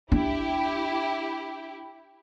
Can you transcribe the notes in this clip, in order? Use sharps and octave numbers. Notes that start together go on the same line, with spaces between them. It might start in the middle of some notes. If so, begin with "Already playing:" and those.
D4 E4 G4